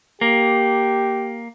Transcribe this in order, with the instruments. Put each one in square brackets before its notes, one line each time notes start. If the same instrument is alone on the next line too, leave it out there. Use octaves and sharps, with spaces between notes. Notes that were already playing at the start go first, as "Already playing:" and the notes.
[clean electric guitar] A#3 [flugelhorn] G4